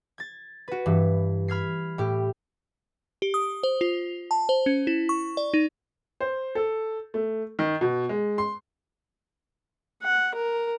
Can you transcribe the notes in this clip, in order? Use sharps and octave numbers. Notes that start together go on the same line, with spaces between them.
G#6 A6
F#4 B4
G2 E3
B5 F6 G#6 C7
A2 G4
G4
D#6
C5
F4
A5
C5
C#4
E4
C#6
D5
D#4
C5
A4
A3
D#3
B2
G#3
C6
F#5
A#4